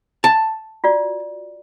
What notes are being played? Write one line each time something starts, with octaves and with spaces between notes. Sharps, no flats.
A5
F4 F#4 D5